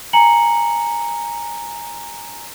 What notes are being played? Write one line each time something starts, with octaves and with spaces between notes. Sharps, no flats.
G#5 A#5 C#7 F#7